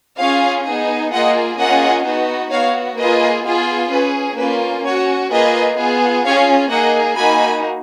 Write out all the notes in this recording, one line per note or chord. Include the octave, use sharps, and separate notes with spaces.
C#4 F4 G#4 C#5 F5
B3 D#4 G#4
A#3 F4 G#4 D#5 F#5
A#3 C#4 F4 G#4 D#5 F#5
B3 D#4 F#4
B3 F#4 C#5 F5
A#3 F4 G#4 B4 D#5
B3 F4 G#4
C#4 G#4 B4
A#3 C#4 F4 B4
C#4 F#4 C#5
A#3 F4 G#4 B4 D#5
B3 F4 G#4
C#4 F4 G#4 C#5 F5
A#3 D#4 G#4 D#5 F#5
A#3 D#4 F#4 G#5 B5